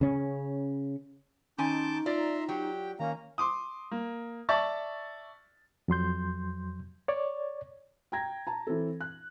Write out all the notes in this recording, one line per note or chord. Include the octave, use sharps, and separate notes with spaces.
C#3 C#4
D#3 C#4 D#4 G#5 A5 C6 D6 G6
F4 D5 E5 A#5 C6
F#3 G4 G5
D#3 A#3 C#4 F5 A#5
C6 D6 D#6
A#3
D5 E5 A5 C#6 A6
F2 F#3 C6 G6
C#5 D5
G5 A#5 G#6 A#6
A5 A#5
E3 C4 A4
F#6